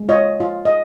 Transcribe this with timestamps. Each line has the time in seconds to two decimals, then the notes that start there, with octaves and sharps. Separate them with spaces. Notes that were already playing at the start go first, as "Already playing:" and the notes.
Already playing: G#3
0.09 F4 C#5 D#5
0.40 F4
0.65 D#5